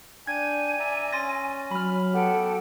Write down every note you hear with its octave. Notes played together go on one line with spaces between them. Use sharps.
D4 G5 G#5 G#6
D5 E5 A#5
C#4 C6 A6 A#6
F#3 B5 F6
B3 G4 A4 F#5 G5